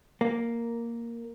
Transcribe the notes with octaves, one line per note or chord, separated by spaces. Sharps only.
A#3